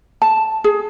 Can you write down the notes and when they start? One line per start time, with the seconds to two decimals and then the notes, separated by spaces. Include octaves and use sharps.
0.22 A5
0.64 G#4